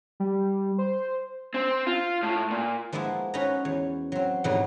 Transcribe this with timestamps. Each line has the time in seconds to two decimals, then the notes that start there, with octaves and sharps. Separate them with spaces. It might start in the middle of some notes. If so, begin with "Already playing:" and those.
0.20 G3
0.78 C5
1.54 C4
1.87 F4
2.23 A2
2.50 A#2
2.93 F3 G#3 A#3 B3 E4
3.34 C#4 D#4 F#4 B4 F#5 A#5
3.65 E2 C#5
4.12 F#3 C4
4.44 F2 G#2 B2 E3 F#3 G3